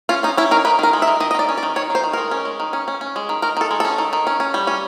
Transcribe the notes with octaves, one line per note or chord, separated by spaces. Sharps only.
C#4 F4
C#4 D#4
C#4 E4
D#3 A#4
D#3 B4
D#3 A#4
G#3
E5
D#3
D#3 D#5
D#5
D#3 D5
C#4
D5
D#3
D#3 C#5
D#3
C5
D#3
G#3 A#4
C#4
G#3
D#3
C#4
C#4
C#4
G#3
D#3
D#3 A#4
D#3 A4
G#3
C#4 A4
D#3
D#3
C#4
C#4
G3
C#4